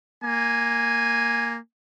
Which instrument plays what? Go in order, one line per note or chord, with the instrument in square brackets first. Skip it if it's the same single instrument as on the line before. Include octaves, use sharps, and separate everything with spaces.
[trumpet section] A#3 G#5